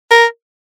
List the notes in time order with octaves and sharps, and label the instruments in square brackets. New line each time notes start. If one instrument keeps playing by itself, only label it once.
[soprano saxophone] A#4